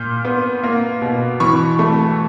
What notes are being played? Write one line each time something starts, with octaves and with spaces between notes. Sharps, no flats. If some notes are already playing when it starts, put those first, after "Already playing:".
Already playing: A#2 F6 G6
B3
A#3
B2
E3 B5 C#6
A3